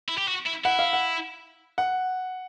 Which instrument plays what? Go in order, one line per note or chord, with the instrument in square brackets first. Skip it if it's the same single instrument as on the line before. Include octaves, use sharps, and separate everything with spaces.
[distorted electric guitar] E4
G4
F#4
E4
[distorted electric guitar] E4 [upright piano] F#5
[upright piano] F5
F#5
F#5